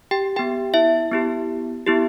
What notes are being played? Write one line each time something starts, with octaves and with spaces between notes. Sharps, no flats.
G4 G5
B3 G4 G5
E4 E5
B3 E4 G4
B3 E4 G4